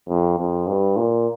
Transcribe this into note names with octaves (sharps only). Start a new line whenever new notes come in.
F2
F2
G2
A#2